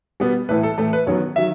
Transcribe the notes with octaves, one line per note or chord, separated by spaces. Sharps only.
B2 G3 B3
A2 E3 A3 B4
A4
A2 E3 A3 A4
B4
F#2 D#3 F#3 B3 C#5
D#3 F#3 E5